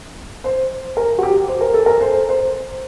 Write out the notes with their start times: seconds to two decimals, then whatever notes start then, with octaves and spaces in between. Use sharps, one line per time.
0.44 C5
0.97 A#4
1.18 F#4
1.23 G4
1.48 C5
1.61 A#4
1.74 A4
1.86 A#4
2.01 C5
2.29 C5